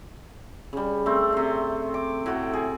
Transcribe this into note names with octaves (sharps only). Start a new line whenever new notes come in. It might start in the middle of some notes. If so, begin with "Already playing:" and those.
C#3 G3
A3 C4
C3 C6
D6
A2 F#4 G5
G#4